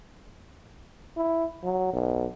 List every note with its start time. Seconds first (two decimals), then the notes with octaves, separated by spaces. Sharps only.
1.17 E4
1.63 F#3
1.93 B1